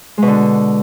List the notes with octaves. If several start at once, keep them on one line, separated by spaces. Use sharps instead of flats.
B2 D3 G#3